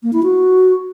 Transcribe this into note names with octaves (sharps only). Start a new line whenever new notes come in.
A#3
E4
F#4